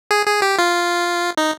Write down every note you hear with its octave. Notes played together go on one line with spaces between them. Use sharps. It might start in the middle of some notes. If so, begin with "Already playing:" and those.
G#4
G#4
G4
F4
D#4